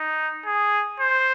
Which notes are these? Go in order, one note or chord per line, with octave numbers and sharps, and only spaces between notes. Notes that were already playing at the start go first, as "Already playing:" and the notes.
Already playing: D#4
G#4
C5